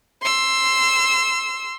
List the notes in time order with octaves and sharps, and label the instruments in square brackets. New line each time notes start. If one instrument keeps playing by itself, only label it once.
[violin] C6 E6